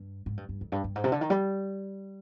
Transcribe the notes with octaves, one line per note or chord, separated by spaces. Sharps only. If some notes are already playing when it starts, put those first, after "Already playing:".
Already playing: G2
G#2
G2
G2
F2
G2
G2
G#2
C3
D3
D#3
G3